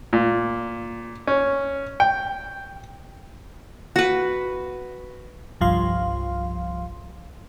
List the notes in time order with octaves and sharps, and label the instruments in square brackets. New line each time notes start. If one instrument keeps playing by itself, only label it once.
[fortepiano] A#2
C#4
G5
[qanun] F#4 B4
[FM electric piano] G1 C2 G2 F3 F5 C6